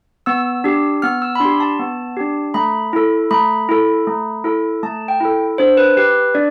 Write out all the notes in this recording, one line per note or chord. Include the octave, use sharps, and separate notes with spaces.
B3 E6
D4 G4
B3 F6
E6
B5
D4 G4 C6
A5
B3
D4 G4
A3 B5
E4 A4
A3 B5
E4 A4
A3
E4 A4
A3 A5
G5
E4 A4
D4 C5
B4
G4 B4
D4 D5